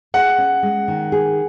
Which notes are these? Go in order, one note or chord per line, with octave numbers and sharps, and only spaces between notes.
G#4 F#5
C#4
G#3
D#3
G#4